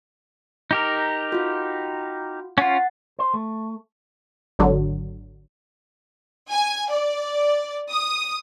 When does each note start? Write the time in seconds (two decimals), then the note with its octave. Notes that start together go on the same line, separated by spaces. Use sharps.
0.71 D#4 G4 A#4
1.32 F4 F#4
2.58 C#4 F4 F#5 A6
3.19 C5
3.34 A3
4.59 G#1 D3 F#3
6.50 G#5
6.91 D5
7.90 D#6